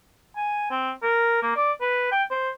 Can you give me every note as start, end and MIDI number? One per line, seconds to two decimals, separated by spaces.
0.36 0.70 80
0.70 0.91 60
1.03 1.39 70
1.42 1.51 58
1.56 1.72 74
1.81 2.07 71
2.11 2.23 79
2.30 2.50 72